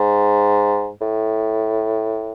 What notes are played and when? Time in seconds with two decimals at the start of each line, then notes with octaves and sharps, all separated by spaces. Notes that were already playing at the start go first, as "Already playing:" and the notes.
Already playing: G#2
1.01 A2